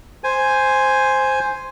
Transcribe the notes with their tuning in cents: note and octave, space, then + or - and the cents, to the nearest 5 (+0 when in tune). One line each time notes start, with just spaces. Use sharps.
C5 +0 G#5 +0